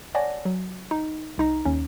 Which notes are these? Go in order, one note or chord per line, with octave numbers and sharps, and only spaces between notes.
C#5 D5 F#5 G#5 A5 A#6
F#3
D#4
C2 D#4 A#5
D#2 C#4